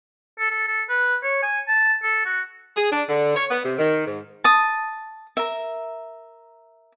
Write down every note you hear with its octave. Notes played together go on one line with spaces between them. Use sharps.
A4
A4
A4
B4
C#5
G#5
A5
A4
F#4
G#4
D4
D3
C#5
B3
C3
D#3
G#2
A5 D#6
A#4 E5